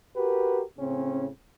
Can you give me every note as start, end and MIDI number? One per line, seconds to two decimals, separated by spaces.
0.17 0.62 66
0.17 0.62 67
0.17 0.62 70
0.17 0.62 71
0.79 1.30 45
0.79 1.30 49
0.79 1.30 60
0.79 1.30 61